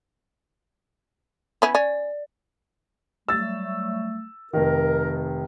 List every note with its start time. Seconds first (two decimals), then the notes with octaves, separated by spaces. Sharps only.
1.62 B3 C#4 E4
1.75 C#4 D5
3.28 F#3 G3 A3 E6 A6
4.53 F1 D#3 A#4